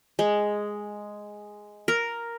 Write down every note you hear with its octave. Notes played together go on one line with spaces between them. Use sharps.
G#3
A#4